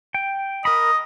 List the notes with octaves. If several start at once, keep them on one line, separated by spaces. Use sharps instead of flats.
G5
A#4 D#5 B5